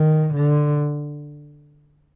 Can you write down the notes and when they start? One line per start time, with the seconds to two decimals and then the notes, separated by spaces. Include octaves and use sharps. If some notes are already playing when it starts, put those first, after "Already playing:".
Already playing: D#3
0.34 D3